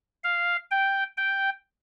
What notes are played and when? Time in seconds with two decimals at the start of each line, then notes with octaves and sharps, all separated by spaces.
0.24 F5
0.71 G5
1.17 G5